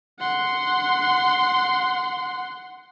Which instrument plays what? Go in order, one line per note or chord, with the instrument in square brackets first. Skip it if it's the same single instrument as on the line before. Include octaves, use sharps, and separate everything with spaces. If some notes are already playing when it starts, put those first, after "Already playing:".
[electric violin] F#5 C6